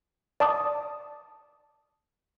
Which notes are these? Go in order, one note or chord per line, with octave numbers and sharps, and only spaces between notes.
D5 A5 D6 D#6